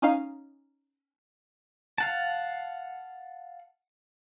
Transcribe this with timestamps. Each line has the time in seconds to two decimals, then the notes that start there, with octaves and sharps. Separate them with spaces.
0.02 C#4 D#4 F5
1.98 F5 F#5 A5